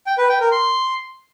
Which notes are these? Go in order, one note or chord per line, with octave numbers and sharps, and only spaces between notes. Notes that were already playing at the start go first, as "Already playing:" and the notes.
G5
B4
G5
A#4
C6